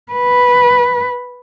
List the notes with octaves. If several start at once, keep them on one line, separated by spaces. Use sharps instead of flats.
B4